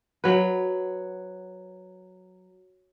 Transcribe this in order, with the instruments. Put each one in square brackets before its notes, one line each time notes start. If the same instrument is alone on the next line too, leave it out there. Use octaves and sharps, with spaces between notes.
[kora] F#3 B4